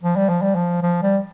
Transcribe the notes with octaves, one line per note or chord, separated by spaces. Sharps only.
F3
G3
F3
G3
F3
F3
G3